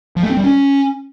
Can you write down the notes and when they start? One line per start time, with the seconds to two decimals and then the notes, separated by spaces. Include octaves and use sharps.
0.16 F3
0.23 A3
0.30 C4
0.37 G3
0.44 C#4